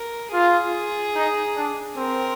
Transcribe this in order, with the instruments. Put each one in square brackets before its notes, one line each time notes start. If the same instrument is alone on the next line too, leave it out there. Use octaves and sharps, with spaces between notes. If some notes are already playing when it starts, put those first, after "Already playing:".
Already playing: [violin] A#4
[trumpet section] F4 [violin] G#4
[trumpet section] D#4
D4
[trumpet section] C4 [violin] A#4